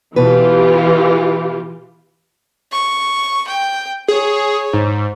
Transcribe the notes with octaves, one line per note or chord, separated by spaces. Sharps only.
B2 E3 F4 G4 B4
C#6
G5
G#4 C#5
G#2